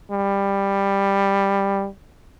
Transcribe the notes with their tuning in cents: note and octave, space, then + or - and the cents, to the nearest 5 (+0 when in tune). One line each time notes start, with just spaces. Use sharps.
G3 +10